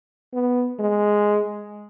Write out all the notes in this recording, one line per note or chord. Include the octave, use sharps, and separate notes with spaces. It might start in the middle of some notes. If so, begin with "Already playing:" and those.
B3
G#3